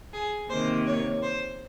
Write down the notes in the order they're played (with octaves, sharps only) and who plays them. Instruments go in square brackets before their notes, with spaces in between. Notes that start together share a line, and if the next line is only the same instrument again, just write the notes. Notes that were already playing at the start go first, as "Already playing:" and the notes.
[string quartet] G#4
C3 D#3 A#3 C5
C#5
C5